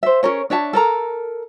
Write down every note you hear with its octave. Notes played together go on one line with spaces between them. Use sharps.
C5 E5
C#4 G#4 A#4 C#5
D4 C#5 E5 A5
A4 A#4 A#5